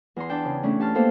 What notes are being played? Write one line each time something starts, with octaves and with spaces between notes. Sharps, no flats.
E2 A#5 C6
D4 G5 A5
C#3
A3 B3 C#4 D4
G4 A5 C6 F6
A#3 B3 A4 C5 F5 G5